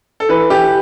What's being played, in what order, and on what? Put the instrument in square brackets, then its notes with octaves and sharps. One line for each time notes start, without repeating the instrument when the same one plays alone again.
[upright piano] A4
E3 B4
E3 G4